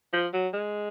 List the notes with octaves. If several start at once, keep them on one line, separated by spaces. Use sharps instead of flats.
F3
F#3
G#3